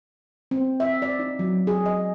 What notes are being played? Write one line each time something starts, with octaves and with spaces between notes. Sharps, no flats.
C4
E5
D5
D#4
F#3
G#4
D#5